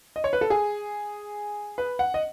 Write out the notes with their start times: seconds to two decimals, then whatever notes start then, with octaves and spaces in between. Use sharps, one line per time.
0.16 D#5
0.24 C#5
0.33 B4
0.41 A4
0.50 G#4
1.78 B4
1.99 F#5
2.14 D#5